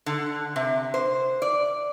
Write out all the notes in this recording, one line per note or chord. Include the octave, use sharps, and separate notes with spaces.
D3
C3
C5
D5